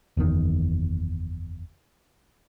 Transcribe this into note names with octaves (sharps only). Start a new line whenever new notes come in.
F#1 E2 D#3